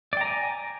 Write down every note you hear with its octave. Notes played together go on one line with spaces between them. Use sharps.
D5 G5 G#5 A#5